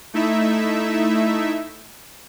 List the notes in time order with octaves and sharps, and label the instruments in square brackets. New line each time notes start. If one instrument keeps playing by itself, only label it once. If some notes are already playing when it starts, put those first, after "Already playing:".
[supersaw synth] A3 D#4 E4 E5